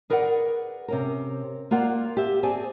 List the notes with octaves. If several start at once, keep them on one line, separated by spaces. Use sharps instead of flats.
G#4 A#4 B4 D5 F5 F#5
C3 C#4 A#4
A#3 F4 D5 F#5
G4 E5
C4 G#4 D5 G#5 A5